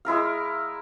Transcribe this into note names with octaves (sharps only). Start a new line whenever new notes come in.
G#3 E4 A#4 F5